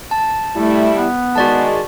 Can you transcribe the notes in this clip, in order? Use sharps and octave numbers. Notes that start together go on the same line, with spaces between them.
A5
G3 A3 E4
B3
D#3 G#3 F#4 D5 A5